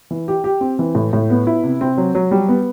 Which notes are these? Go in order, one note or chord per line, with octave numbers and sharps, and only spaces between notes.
E3
G4
G4
C4
E3
A2
A2
B3
E4
C3
C4
F#3
F#3
G3
B3